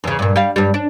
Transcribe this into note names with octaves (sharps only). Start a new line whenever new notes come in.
E2 C#3
G2 A#2
G3 F5
G2 G3
D4